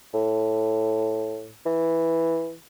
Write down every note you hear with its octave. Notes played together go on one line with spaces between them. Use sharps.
A2
E3